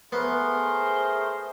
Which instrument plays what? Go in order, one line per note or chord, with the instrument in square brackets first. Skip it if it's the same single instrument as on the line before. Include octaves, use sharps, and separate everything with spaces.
[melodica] A3 A#4 [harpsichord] B3 [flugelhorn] G#4 [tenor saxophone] C5